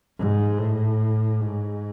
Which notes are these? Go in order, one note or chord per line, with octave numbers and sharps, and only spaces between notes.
G#2
A2
G#2